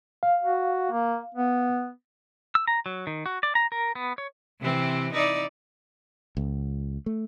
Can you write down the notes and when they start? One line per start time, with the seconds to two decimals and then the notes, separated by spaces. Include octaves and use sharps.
0.23 F5
0.42 F#4
0.91 A#3
1.35 B3
2.55 E6
2.67 A#5
2.86 F#3
3.07 D#3
3.26 F#4
3.43 D5
3.55 A#5
3.72 A#4
3.95 B3
4.18 C#5
4.60 C3 E3 C4
5.13 D#4 E4 D5
6.37 C#2
7.06 A3